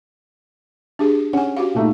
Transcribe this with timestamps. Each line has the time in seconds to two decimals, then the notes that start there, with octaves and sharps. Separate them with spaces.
0.99 D4 G4 G#4
1.33 C#4 F#5 G#5
1.57 F#4 G4 F5
1.75 A#2 A3 D#4